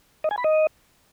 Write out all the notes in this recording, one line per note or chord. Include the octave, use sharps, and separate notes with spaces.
D#5
G#5
B5
D#5